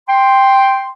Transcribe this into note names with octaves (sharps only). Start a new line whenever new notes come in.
G5 C6